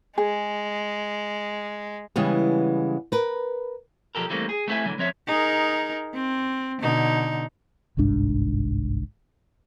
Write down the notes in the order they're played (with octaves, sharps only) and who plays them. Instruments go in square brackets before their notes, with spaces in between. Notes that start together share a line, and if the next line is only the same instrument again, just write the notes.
[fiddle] G#3 [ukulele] G#4
[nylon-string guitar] C#3 E3 G3 G#3 B3
A#4 B4
[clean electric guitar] B1 F3 G4 A4 A#4
E3 G3 A3 A#3 C4
G#4
A3 B3 C4 E4 E5 G#5
A2 D3 E3 F#3
F3 C4 C#5 E5
[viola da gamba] D#4 G#4 A#4
C4
B2 D3 D#4
[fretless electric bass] G1 C2 G#2 D4